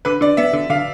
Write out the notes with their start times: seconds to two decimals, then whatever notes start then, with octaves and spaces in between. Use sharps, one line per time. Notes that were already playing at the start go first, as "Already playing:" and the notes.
0.05 D3 B4
0.21 D3 D5
0.37 B3 E5
0.53 D3
0.70 D3 F5